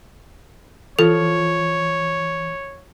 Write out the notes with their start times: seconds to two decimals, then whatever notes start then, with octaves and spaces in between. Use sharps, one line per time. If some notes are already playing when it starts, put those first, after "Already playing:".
0.99 E3 F3 A4 C#5